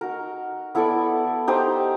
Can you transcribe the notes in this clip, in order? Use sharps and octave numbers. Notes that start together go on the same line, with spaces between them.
D#4 F#4 A#4
B3 E4 A4 D5
D#4 G4 C5